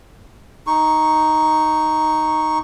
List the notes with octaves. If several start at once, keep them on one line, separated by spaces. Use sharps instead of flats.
D#4 C#6